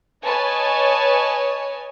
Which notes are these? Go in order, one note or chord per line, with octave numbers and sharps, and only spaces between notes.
B4 C#5 D#5 G#5 A5